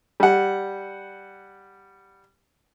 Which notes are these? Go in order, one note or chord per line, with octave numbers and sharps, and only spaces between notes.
G3 F#5